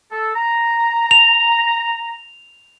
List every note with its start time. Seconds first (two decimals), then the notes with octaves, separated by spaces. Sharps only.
0.11 A4
0.35 A#5
1.11 F7